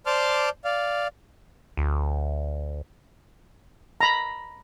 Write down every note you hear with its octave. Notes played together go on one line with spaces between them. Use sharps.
C5 D5 A5 C6 D6 F6
D5 F5
D2
A#5 B5